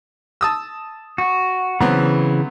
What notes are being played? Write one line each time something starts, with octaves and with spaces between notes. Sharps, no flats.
A5 D#6 E6
F#4
C#3 E3 F#3 B3 C4 B5